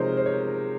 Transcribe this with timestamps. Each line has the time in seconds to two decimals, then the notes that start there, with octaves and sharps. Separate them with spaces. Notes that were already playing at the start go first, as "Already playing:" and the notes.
Already playing: C3 F3 G#3 D#4 A#4 C5 C#5
0.17 C5
0.26 C#5